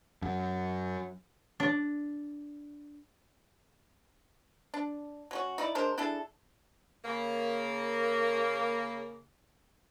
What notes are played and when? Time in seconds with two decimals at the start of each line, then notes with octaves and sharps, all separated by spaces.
0.22 F#2
1.60 D4
4.74 D4
5.31 F#3 C#4 F#4
5.58 D#4 E4 D5
5.75 G#3 D4 A#4 C5
5.98 D4 E4 G#4 A4
7.05 C#3 A#3